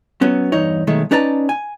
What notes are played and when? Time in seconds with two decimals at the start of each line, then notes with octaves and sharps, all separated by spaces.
0.21 F#3 B3 C#4
0.52 E2 G2 D#4 C#5
0.87 B1 D#3 G#3 A3
1.11 C#4 D#4 B4 D5 A5 A#5
1.49 G#5